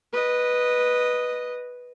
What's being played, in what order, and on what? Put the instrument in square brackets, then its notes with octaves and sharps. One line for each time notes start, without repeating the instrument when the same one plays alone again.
[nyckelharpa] B4 D#5